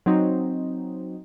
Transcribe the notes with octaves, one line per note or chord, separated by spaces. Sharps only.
F#3 C4 D#4